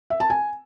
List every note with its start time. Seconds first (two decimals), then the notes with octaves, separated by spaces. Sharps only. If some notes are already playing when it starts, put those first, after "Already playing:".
0.10 E5
0.20 A5
0.30 G#5